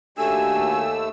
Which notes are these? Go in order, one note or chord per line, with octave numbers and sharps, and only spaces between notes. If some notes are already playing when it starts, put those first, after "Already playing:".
D#2 A3 D4 F#4 G4 G#5 E6